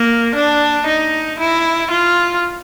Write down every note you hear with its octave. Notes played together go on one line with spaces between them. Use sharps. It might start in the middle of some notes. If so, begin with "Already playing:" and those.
Already playing: A#3
D4
D#4
E4
F4